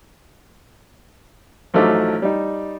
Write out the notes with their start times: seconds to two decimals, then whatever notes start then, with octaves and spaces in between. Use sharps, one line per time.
1.74 A1 F3 F#3 A3 D#4 D6
2.22 G3 D#4